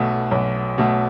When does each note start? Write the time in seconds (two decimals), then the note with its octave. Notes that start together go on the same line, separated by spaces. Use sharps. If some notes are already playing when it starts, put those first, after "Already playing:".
Already playing: B1 B2 A3
0.31 B1
0.78 B2 A3